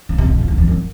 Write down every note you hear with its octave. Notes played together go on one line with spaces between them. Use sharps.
C#3
C3
B2
F2
E2
F2
F#2